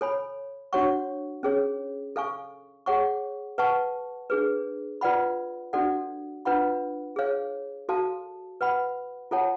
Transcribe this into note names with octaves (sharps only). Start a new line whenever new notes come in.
A4 C#5 G#5 B5
D4 F#4 C#5 F#5 C#6
C#4 G#4 C#5
A4 F5 G#5 C#6
G#4 C#5 F#5 C#6
B4 F#5 A5 C#6
D4 G#4 B4
F4 B4 D5 F#5 B5
D4 F#4 A4 D5 F#5
D4 F4 B4 F#5 B5
G#4 C#5 F5
F#4 A4 F5 A5
B4 F#5 B5
F4 A4 C#5 F#5 A5